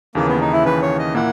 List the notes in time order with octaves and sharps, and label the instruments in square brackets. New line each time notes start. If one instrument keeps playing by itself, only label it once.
[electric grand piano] D#2 C#3 E3 [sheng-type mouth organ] A#3
[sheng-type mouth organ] B3
D#4
E4
[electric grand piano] D#2 C#3 E3 [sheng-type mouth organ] B4
[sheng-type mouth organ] C#5
D#5
[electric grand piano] A#2 A#3 E4 [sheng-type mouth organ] F#5